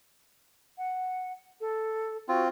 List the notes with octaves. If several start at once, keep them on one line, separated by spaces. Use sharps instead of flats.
F#5
A4
C4 F4 F#4